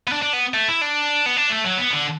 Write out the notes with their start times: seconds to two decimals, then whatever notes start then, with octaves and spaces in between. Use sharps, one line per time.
0.08 B3
0.12 D4
0.22 D4
0.33 B3
0.54 A3
0.68 E4
0.81 D4
1.26 B3
1.37 D4
1.50 A3
1.65 F#3
1.78 B3
1.92 D3